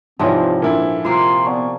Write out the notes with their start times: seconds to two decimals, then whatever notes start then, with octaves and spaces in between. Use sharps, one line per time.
0.19 G#2 C3 E3 F3 C4 C#5 D5 A5
0.62 A#2 D4 E4 A4 A#4
1.05 C3 A#3 F4 C6
1.46 B3 D5 A5 C#6